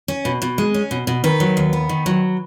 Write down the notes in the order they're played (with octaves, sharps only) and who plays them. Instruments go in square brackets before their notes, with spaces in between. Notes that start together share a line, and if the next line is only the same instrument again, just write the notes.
[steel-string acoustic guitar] C#4
B2
B2
G#3
C#4
B2
B2
D#3 B4
F#3
D#2
B3
D#3
F#3